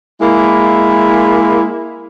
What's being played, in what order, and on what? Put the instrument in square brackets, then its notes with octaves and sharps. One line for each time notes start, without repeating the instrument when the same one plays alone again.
[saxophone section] G#3 A#3 E4